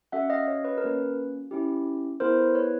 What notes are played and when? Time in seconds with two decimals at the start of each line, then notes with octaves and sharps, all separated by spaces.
0.12 C#4 F#4 A4 E5 F#5
0.30 D#5 F5
0.47 C#5 D#5
0.64 B4 C#5
0.77 A#4
0.82 A#3 C#4 F#4 A4 B4
1.51 C#4 E4 G4
2.20 B3 E4 G#4 A#4 C5
2.38 B4
2.55 B4 C#5